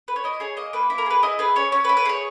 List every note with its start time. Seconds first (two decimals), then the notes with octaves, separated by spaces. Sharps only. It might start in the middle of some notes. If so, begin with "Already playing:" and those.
0.08 B4
0.16 C#5
0.24 E4 D#5
0.40 G#4 C#5
0.57 A#3 D#5
0.73 A#3 B4
0.90 E4
0.98 A#4
1.06 G#4 B4
1.23 E4 D#5
1.39 G#4 B4
1.56 C#4 C#5
1.72 C#4 C#5
1.84 B4
1.89 E4
1.97 B4
2.05 G#4 C#5